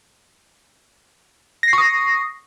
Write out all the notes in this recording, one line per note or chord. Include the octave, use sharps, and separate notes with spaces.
C#6 D#6 A#6 C7